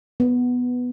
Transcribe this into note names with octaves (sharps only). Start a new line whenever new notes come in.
B3